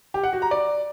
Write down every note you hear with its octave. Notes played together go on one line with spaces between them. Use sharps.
G4
F#5
F#4
A#5
D5